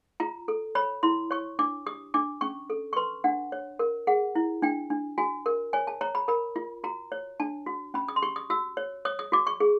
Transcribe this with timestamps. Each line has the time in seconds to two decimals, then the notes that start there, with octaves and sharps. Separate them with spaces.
0.20 F4 A#5
0.48 A4
0.75 C#5 B5
1.03 E4 C6
1.31 C#5 C#6
1.59 D4 D6
1.86 G4 D#6
2.14 D4 D6
2.41 C#4 C#6
2.70 A4
2.93 C#6
2.96 B4 C6
3.24 D4 F#5
3.52 C#5
3.79 A#4
4.07 G#4 F#5
4.35 E4
4.62 D4 G5
4.90 D4
5.18 F#4 G#5
5.46 A#4
5.73 C#5 G#5
5.87 A5
6.01 C#5 A#5
6.15 B5
6.28 A#4 B5
6.56 F4
6.84 F#4 A#5
7.12 C#5
7.40 D4 A5
7.66 F#4
7.94 C#4 B5
8.08 D#6
8.16 C6
8.22 G4 C#6
8.36 D#6
8.50 F#4 E6
8.77 C#5
9.05 C#5 D#6
9.19 D#6
9.32 F#4 D6
9.47 C#6
9.60 G#4